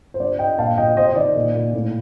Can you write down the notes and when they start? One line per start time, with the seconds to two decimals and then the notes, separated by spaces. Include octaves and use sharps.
0.14 C5
0.20 G2 D5
0.39 G2 D#5 G5
0.58 A#2 F5 A5
0.77 A#2 D#5 G5
0.97 C3 C5 D#5
1.07 D#5
1.16 D#3 D5
1.36 A#2
1.55 A#2
1.74 A2